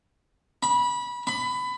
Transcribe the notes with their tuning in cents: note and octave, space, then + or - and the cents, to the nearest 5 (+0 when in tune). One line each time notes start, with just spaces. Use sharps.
B5 -20
B5 +20